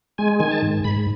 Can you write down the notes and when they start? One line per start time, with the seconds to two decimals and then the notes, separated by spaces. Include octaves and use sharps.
0.18 G#3 G#5
0.40 D#3 G#5
0.51 A5
0.63 G#2
0.84 G#2 B5